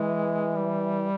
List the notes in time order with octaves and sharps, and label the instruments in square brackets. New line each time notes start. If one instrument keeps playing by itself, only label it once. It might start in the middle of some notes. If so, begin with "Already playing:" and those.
Already playing: [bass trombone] E3 [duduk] G#3
[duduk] G3